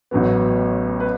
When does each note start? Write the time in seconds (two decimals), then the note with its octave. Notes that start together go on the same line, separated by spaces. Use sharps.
0.11 A1 A2 F#3 B3
1.00 B4